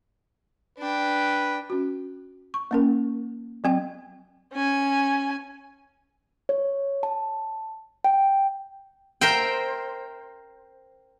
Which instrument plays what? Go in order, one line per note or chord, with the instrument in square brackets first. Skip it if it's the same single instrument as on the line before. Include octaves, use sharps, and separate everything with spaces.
[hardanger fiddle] D4 G5 [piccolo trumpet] B4
[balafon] C#4 F#4
C#6
A#3 C#4 A#4
F#3 C4 G5
[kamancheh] C#4 G#5
[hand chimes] C#5
A5
G5
[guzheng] A#4 C5 E5 G5